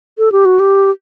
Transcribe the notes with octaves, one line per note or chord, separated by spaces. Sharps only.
A4
G4
F#4
G4